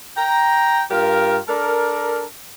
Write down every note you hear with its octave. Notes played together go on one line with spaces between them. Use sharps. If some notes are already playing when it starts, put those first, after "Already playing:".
G5 A#5
G2 F4 G4 A#4
D4 A4 A#4